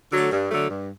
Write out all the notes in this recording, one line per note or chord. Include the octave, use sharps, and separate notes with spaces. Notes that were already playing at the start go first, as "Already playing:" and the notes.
D3 F#3 A3
G2
D3 F#3 A3
G2